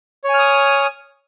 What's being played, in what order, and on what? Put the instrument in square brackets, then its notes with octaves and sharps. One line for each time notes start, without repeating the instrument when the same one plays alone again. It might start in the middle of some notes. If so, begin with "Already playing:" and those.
[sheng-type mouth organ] C#5
G#5
F6
D#6